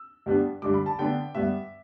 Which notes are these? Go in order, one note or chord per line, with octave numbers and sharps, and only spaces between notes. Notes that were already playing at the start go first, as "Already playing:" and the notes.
Already playing: E6
G2 G3 B3 D4
G2 D3 G3 D6
B5
A5
D3 B3 D4 G5
G2 G3 B3 E5